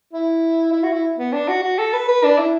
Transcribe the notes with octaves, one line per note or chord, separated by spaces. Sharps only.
E4
E4
F#4
E4
B3
D4
F#4
F#4
A4
B4
B4
D4
E4